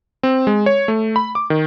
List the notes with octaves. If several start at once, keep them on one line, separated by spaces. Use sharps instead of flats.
C4
G#3
C#5
A3
B5
D6
D#3